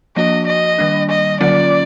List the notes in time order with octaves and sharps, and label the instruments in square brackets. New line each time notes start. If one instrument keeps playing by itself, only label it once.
[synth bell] F3 A#3 D4 F#4 [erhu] D#5
[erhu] D#5
[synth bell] D#3 G3 A#3 D4
[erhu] D#5
[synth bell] D3 F#3 A#3 C#4 F4 [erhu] D5